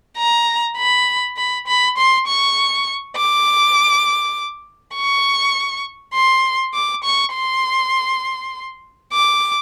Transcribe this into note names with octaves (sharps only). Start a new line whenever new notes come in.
A#5
B5
B5
B5
C6
C#6
D6
C#6
C6
D6
C#6
C6
D6